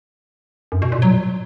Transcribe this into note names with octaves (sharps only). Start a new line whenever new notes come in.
F#2
B2
A#2
F#3